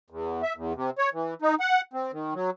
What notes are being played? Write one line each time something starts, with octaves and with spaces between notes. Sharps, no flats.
E2
E5
E2
C3
C#5
E3
D#4
F#5
C4
D#3
F#3